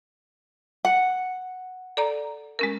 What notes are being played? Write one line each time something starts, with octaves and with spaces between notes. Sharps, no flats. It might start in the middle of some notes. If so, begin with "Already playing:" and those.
F#5
A4 D5 A#5
G#3 C#4 A#4